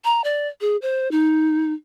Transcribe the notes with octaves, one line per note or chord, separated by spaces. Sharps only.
A#5
D5
G#4
C5
D#4